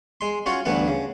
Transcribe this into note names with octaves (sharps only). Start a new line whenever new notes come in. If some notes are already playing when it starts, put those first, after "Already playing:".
G#3 C6
C#4 F4 F#4 C#5
D2 G2 E3 A3 B3 F#5
C#3